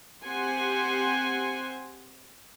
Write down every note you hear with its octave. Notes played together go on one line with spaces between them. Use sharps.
C4 G4 C5 F#5 G#5 C6